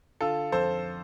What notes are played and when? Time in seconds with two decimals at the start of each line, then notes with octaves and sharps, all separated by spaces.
0.21 D3 F4 A4
0.52 F2 A4 C5